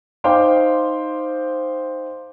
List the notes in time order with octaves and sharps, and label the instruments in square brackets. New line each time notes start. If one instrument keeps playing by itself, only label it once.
[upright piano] D#4 C5 F5 G5 C6 D6